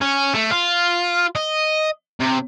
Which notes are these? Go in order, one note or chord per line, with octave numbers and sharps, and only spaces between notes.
C#4
A3
F4
D#5
C3